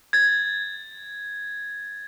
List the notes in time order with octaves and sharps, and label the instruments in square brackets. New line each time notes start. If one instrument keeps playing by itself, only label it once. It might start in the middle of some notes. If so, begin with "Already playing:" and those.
[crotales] G#6 A6